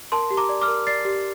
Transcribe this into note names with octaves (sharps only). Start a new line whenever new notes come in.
A#4 A5 C6
G4
A#5 D6
D5
D6 F6
A#4
D5 A6 C7
G4